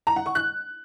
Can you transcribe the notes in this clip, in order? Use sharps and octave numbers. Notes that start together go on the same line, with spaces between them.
A#5
F#5
C#6
F#6